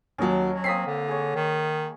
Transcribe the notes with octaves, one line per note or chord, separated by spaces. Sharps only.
D#2 F#3 C#4 D#5 A5
F#3
A#3 C4 D#6 B6 C7
D3
G#4 C#5
D#3